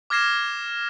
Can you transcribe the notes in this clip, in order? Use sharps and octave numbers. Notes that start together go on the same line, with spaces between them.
D6 F6 G#6 A#6 C7 E7